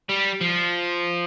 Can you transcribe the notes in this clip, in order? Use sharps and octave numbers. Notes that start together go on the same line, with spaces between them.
G3
F3